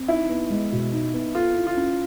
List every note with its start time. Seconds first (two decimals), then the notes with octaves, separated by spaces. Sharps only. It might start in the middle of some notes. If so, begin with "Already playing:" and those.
Already playing: C4
0.08 D#4 E4
0.30 B3
0.50 G#3
0.72 B2
0.93 D#4
1.14 B3
1.35 F4 A4
1.56 E4
1.67 F4
1.77 C#4